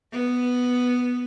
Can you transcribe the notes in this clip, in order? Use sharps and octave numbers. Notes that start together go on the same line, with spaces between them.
B3